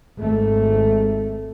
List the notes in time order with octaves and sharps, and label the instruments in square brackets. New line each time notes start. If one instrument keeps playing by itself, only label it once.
[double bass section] G#1 A3